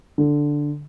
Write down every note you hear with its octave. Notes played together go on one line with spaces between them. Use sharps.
D3